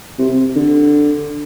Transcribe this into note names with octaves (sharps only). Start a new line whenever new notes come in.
C3
D3